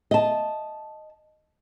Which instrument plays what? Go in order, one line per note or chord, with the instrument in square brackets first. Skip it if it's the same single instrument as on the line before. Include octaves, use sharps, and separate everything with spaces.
[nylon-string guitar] D#5 A5